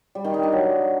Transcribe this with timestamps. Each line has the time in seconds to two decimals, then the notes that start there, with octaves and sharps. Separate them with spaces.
0.15 G3
0.24 D#3
0.34 D#4
0.43 D4
0.52 F#3